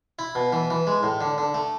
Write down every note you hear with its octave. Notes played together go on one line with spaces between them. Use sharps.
E4
B2
E3
E3
G#3
A2
D3
D3
A3